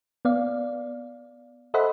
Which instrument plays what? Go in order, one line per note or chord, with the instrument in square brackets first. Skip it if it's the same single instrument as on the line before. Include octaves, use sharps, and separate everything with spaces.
[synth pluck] B3 D5 F5
A4 C5 D#5 E5 F#5 B5